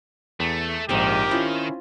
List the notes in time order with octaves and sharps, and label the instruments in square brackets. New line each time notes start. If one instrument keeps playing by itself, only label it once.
[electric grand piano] E2 [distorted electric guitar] A3
[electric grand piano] A#1 G#2 D#7 [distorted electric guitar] D#3 [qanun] C4 D#4 [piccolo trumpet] G4
[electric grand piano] C#4 E4 [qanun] F4 C5 D#5